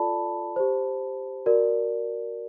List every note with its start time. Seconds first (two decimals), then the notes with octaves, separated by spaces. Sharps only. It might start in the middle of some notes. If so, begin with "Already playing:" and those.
Already playing: F4 A4 D5 A5 B5
0.56 G4 C5
1.46 F#4 A#4 D5